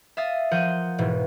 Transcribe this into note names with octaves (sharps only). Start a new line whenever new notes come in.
E5 F5 D#6 A6
F3 A#4 F#5 G6 D#7
E1 G#2 B2 E3